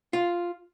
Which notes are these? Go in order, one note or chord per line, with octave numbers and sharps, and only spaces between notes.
F4